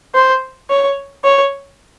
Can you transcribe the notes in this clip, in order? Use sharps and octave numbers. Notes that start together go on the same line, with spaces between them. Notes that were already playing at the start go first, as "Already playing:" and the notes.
C5
C#5
C#5